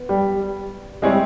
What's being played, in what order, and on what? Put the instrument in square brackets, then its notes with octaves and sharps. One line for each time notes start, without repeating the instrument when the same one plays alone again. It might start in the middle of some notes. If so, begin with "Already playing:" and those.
Already playing: [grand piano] B3
[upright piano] G3
[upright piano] G3 [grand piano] G#3 C4 E4 G#4 C#5